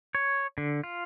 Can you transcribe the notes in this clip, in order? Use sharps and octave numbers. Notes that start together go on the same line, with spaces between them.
C#5
D3
F4